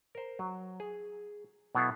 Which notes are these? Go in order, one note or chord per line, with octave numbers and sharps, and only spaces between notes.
A#4 C5
F#3
G#4
B2 F#3 B3 E4 A4 F5